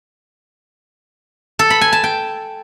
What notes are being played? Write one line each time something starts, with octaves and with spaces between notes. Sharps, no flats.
A4
B5
G#5
A5
G5